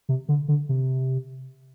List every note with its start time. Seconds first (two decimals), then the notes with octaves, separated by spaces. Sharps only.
0.09 C3
0.29 D3
0.48 D3
0.69 C3